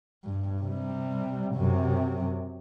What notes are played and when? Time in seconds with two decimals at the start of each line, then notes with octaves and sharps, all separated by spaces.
0.24 G2
0.62 C3 G3
1.54 F#2 C3